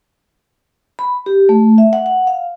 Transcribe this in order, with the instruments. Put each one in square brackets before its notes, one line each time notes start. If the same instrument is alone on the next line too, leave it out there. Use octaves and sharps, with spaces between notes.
[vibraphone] B5
G4
A3
E5
F#5
F#5
F5